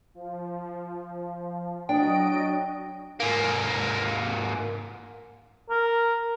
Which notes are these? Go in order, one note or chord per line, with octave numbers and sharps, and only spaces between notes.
F3
F#3 D4 D#5 G5 D7
G#2 A#3
A#4